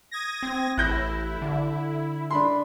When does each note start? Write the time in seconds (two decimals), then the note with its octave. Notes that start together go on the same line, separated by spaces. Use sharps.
0.11 D#6 G#6 A#6
0.43 C4
0.78 A1 E4 F#6 G6 A#6
1.42 D3
2.31 D4 B5 C6